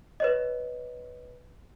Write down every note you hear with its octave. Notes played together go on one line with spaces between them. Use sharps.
B4 C#5 D#5